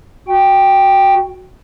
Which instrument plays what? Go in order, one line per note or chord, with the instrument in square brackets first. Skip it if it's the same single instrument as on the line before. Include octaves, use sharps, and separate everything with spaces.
[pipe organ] F#4 G5